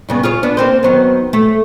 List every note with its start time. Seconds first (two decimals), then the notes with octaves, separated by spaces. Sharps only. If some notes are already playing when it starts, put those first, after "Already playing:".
0.09 G2 C#3 B3
0.23 F4 G#4 C#5
0.43 B3 D4
0.57 A#3 C4 C5
0.83 D#3 F#3 B3
1.33 A3